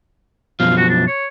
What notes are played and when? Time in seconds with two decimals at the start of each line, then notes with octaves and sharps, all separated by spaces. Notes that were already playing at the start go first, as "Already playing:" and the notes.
0.60 F#2 B2 F3 F5
0.77 F#4
0.89 D4
1.07 C#5